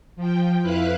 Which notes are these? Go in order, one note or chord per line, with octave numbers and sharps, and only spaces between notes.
F3 G5
F2 E4 B4 F5 F#6